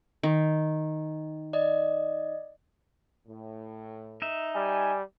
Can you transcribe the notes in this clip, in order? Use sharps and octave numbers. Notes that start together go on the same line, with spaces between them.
D#3
D5 D#5
A2
D#4 E5
G3 G#5